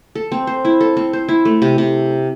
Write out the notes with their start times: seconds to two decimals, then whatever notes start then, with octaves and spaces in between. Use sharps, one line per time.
0.15 A4
0.32 C4
0.47 C5
0.65 E4
0.81 A4
0.97 C4
1.13 C5
1.29 E4
1.45 A3
1.62 C3
1.78 C3